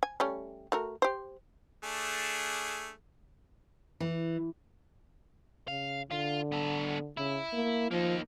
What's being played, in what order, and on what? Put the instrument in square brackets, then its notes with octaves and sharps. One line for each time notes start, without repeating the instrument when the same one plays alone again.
[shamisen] G#5
G3 A3 C#4
A3 F#4 A#4
G4 C5
[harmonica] A3 D4 G#4
[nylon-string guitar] E3
[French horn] C#3 [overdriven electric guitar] F5
[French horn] D3 [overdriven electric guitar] F4
[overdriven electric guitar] B3 A4
[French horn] C#3 [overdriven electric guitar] E4
[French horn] A#3
[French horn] F3 [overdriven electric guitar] A#3 D#4